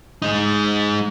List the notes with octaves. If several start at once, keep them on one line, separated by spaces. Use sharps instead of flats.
G#3 D#4